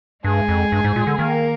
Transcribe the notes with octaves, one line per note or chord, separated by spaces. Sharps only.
G2 G#3 G#4
F2
G2
G#2
A#2
D3
D#3 A#3 A#4